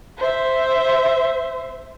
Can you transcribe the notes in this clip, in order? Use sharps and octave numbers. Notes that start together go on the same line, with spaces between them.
C5 E5